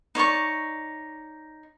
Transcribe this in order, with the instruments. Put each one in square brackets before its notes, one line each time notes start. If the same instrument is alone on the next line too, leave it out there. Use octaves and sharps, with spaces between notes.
[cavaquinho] D#4 C#5 D5 C#6